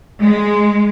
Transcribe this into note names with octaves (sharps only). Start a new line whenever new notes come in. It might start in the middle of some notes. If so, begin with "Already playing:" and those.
G#3